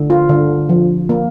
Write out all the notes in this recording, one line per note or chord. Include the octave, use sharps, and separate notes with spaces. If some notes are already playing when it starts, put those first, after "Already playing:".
Already playing: D3
F4
D3
F3
A#3